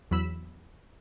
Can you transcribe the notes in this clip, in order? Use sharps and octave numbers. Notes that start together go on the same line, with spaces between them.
E2 F#3 B5 E6